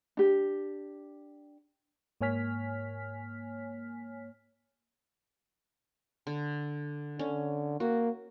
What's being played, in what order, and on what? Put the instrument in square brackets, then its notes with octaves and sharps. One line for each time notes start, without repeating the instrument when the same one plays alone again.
[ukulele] D4 G4
[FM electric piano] G#2 A#3 C#5 G#5 F6 B6
[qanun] D3
[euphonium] D3 [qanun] C#4
[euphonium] A#3 [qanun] F#4